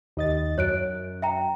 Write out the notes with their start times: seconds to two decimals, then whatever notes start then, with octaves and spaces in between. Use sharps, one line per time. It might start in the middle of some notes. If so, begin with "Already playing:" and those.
0.17 D#2 D#5 A6
0.58 F#2 C#5 F#6 D7
1.22 E5 G5 A#5